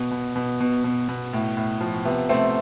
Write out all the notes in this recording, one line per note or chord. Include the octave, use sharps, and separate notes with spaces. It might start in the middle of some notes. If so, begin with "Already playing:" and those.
Already playing: B2
B2
B2
B2
B2
B2
A2
A2
F3
C3 B3
C3 A3 C4